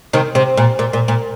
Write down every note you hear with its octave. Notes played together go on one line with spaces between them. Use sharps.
C3 D#3
C3
A#2
A#2
A#2
A#2